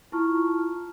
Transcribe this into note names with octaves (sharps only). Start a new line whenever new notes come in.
E4 F4 A5 A#5 C#6 F6